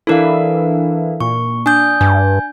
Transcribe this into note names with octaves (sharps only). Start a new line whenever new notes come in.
E3 D4 E4 A4 A#4 F5
A#2 C#6
D4 G#5 D#6 G6
G2 G#5 G6